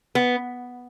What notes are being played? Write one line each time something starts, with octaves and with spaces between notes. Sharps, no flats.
B3